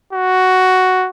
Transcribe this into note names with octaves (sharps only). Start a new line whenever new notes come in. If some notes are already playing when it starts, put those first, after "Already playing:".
F#4